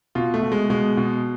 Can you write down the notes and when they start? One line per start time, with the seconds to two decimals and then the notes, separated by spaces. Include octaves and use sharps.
0.15 B2 F4
0.34 A3
0.43 B2
0.52 G#3
0.70 B2 G#3
0.97 B2